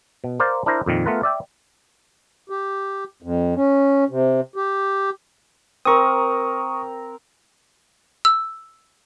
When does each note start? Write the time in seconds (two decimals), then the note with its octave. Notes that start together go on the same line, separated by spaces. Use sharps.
0.24 B2
0.40 A#4 C5 D5 F5
0.66 D4 E4 A#4 C5 A#5
0.86 F2 A#2 D#3
1.06 A3 B3 F4 A#4 B4
1.23 D5 E5 G5
2.50 G4
3.23 F2
3.56 C#4
4.10 C3
4.56 G4
5.85 C4 A#4 C#6 D#6
8.25 E6